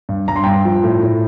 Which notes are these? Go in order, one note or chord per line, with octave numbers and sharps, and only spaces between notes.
G2
G2 A#5
C6
G2 G5 A#5
F3
A2
A2